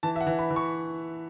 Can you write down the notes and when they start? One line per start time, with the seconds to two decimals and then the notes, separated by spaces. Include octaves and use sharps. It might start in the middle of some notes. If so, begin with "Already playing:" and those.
0.03 E3 A5
0.16 E5
0.21 F#5
0.27 E3
0.39 B5
0.51 E3
0.56 C#6